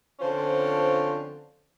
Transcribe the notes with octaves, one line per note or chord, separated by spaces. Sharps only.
D3 F3 C4 C#4 F4 C5